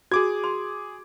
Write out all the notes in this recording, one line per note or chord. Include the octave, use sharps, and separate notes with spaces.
F#4 G#4 D6 G#6
C6